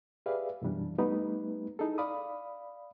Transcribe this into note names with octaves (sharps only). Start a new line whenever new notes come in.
G4 G#4 B4 D5 E5 F5
F#2 B2 E3 G3 D4
G3 A3 B3 D#4 G4 B4
D#4 E4 G#4 A4
D5 F5 B5 D#6